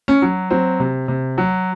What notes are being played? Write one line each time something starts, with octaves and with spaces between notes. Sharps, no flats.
C#4
F#3
F#3 C4
C3
C3
F#3